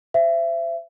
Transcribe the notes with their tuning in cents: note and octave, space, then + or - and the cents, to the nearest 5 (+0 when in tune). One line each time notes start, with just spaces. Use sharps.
C5 +0 E5 +30